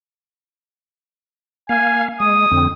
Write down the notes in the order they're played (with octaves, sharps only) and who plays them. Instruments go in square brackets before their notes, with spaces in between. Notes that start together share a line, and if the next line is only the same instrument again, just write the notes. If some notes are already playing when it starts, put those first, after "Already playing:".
[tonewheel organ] A#3 F5 [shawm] G#5
[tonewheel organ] G#3 [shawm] D#6
[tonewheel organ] F2 D3 C4